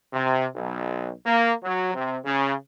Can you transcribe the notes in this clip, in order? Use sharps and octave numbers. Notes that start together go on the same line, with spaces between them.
C3
B1
A#3
F#3
C3
C#3